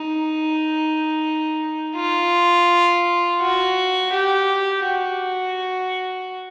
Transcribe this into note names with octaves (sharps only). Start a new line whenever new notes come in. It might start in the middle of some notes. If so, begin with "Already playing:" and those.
Already playing: D#4
F4
F#4
G4
F#4